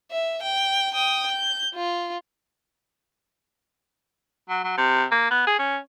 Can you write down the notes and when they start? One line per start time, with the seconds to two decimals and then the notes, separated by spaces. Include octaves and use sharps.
0.11 E5
0.42 G5
0.94 G5 D#6
1.32 G6
1.75 F4
4.49 F#3
4.64 F#3
4.77 C3
5.12 A#3
5.30 B3
5.47 G#4
5.59 C#4